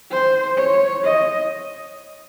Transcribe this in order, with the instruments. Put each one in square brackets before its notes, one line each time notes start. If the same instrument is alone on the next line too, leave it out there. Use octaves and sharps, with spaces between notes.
[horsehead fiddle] C5
C#5
D#5